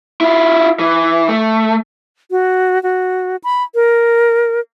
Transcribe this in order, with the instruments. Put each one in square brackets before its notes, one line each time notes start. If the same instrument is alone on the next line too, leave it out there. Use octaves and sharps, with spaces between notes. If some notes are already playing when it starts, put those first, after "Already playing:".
[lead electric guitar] E4 F4
E3
A3
[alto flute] F#4
F#4
B5
A#4